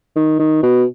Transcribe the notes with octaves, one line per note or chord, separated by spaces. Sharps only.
D#3
D#3
B2